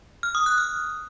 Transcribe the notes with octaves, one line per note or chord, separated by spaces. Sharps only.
F6
D#6
F#6
F6